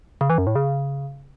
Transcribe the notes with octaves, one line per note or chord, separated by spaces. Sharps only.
C#3
E3
F#2
A2
C#3